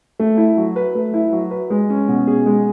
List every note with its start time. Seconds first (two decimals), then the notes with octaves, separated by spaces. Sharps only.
0.19 A3
0.37 E4
0.57 F#3
0.76 B4
0.95 A3
1.14 E4
1.32 F#3
1.51 B4
1.70 G#3
1.90 C#4
2.08 B2
2.27 G#4
2.46 G#3